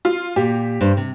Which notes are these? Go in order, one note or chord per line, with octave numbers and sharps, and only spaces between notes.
F4
A#2 G4
G2 C5
C3